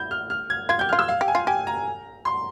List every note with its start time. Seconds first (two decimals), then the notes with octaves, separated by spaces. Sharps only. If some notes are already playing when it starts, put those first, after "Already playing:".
Already playing: E4 G6
0.11 F6
0.30 F6
0.50 G#6
0.69 F4 G#6
0.79 G4 G6
0.89 F4 F6
0.99 E6
1.08 F5
1.21 G4
1.28 G#5
1.35 F4
1.47 G4 G#5
1.67 A#5
2.25 C6